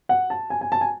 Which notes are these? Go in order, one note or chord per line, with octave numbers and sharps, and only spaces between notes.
F#5
A5
G#5
G#5
A5
G#5